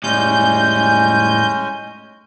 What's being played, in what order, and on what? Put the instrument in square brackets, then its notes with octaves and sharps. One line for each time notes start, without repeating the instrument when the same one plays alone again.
[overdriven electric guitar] A2 G3 [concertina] G#3 C#4 G#5 [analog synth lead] G6